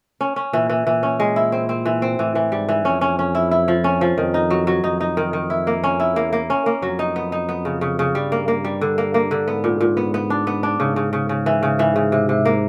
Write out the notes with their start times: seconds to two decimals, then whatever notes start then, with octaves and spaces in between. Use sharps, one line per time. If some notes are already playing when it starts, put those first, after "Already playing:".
0.21 C#4
0.36 C#4
0.53 A#2 E3
0.70 E3
0.86 A#2 E3
1.03 C#4
1.20 G#3
1.36 E4
1.52 C4
1.69 C4
1.86 E3
2.02 C4
2.19 A2 E3
2.35 E3
2.52 G#2 G3
2.69 E3
2.85 F2 C#4
3.01 C#4
3.19 C#4
3.35 E4
3.51 E4
3.68 F3
3.84 C#4
4.01 F3
4.17 F2 D#3
4.34 D#4
4.50 F#3
4.67 F#3
4.84 F2 D#4
5.01 D#4
5.17 D#3
5.33 D#3
5.50 E4
5.67 A#3
5.84 C#4
6.00 E4
6.16 E2 A#3
6.33 A#3
6.50 C#4
6.66 A#3
6.82 F2 F#3
6.99 D#4
7.16 B3
7.32 D#4
7.49 B3
7.65 C#3
7.81 C#3
7.99 C#3
8.15 G2 G3
8.32 A#3
8.48 A#3
8.65 G3
8.81 D3
8.98 A#3
9.14 A#3
9.31 D3
9.47 G#2 B3
9.64 A#2
9.81 A#2
9.97 B3
10.14 B3
10.30 D4
10.47 B3
10.63 D4
10.80 G#2 C#3
10.96 C#3
11.13 C#3
11.29 C#3
11.46 E3
11.63 C#3
11.79 E3
11.96 C#3
12.12 C3
12.29 C3
12.45 A#3